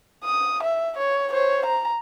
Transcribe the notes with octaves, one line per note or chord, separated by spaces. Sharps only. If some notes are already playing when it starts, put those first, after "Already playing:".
D#6
E5
C#5
C5 C#5
A#5